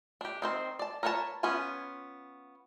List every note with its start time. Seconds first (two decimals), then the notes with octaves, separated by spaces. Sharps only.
0.21 D4 G4
0.42 D#3 C4 C5
0.79 D5 A5
1.03 A#4 B4 C#5 F5 A5
1.43 B3 C#4 F4 G#5